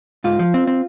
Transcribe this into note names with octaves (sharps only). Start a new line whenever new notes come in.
G#2 F4
F3
C4
C4